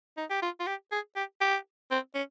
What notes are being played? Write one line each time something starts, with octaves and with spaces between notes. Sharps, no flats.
D#4
G4
F4
F4
G4
G#4
G4
G4
C4
C#4